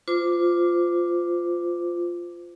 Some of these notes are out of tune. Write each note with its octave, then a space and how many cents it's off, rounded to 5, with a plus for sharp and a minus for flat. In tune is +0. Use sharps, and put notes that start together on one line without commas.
F4 +0 C5 -30 D6 +0